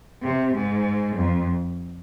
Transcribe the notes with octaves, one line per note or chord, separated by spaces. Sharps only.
C3
G#2
F2